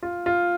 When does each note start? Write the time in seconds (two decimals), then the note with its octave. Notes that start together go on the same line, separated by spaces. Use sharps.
0.03 F4
0.26 F4